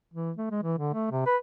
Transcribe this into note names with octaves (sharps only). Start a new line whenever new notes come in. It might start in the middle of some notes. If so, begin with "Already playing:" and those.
E3
A3
G#3
E3
D3
A3
C3
B4